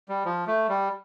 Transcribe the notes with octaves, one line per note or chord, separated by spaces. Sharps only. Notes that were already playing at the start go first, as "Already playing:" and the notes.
G3
F3
A3
G3